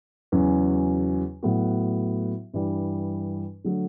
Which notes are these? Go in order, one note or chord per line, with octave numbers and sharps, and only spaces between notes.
E2 C#3 F#3 C#4 F#4
A2 F#3 B3 F#4
G2 E3 G3
D3 F#3 A3